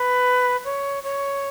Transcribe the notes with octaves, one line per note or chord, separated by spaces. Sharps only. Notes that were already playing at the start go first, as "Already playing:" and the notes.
Already playing: B4
C#5
C#5